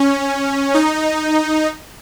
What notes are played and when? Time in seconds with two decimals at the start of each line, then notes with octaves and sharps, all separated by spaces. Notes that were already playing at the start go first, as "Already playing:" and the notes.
Already playing: C#4
0.74 D#4